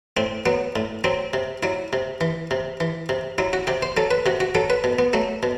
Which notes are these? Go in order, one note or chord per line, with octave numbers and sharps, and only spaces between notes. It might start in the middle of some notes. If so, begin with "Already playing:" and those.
A2 C4
F#3 B3
A2
F#3 C4
C3
F#3 E4
C3
E3
C3
E3
C3
F#3 E4
F#4
C3 G4
C5
F#3 A4
B4
C3 F#4
F#4
F#3 A4
B4
B2
B3
F#3 A3
B2